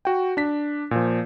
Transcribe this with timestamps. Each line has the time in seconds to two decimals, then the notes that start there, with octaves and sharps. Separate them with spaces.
0.05 F#4 G5
0.37 D4 B6
0.91 A#2 F3